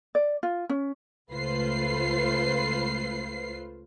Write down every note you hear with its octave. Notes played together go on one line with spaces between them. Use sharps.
D5
F4
C#4
C#2 A3 F4 B4 C5 C7